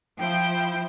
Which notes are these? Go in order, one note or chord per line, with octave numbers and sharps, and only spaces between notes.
F3 E4 G5